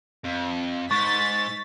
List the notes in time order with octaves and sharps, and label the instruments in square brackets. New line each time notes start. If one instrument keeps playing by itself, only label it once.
[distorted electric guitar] F2
[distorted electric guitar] G#2 [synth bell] C#6 [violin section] A6 B6